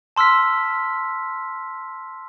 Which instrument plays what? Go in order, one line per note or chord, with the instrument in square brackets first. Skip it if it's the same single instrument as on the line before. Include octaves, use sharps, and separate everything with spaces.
[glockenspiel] A5 C6 E6 F6 B6